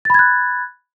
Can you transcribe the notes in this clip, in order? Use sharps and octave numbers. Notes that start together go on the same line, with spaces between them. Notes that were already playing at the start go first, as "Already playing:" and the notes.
B5 F#6 G#6 A6